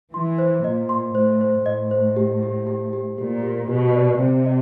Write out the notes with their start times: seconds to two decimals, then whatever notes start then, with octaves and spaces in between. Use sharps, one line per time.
0.13 E3 C6
0.38 C5
0.64 A#2 D#5
0.89 C6
1.15 A2 C5
1.41 C5
1.66 A2 D#5
1.91 C5
2.16 G4
2.43 G4
2.67 G4
2.93 G4
3.18 A#2 G4
3.43 G4
3.69 B2 G4
3.94 D5
4.19 C3 C5
4.45 D#5